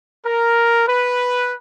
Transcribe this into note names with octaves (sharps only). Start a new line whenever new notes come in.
A#4
B4